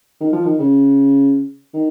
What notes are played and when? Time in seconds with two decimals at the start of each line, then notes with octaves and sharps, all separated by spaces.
0.21 D#3
0.32 F3
0.44 D#3
0.58 C#3
1.74 D#3